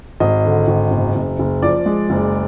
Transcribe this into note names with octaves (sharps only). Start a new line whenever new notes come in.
G#1 D#5
D3
G#1
F#1
F#1
F#1
F3 D5
G#3
F#1